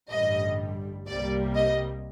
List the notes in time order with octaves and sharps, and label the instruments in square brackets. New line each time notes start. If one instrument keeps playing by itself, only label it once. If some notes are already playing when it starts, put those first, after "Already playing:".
[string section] A1 G2 D3 G3 D#5
C2 C3 G3 A#3 D5
D#5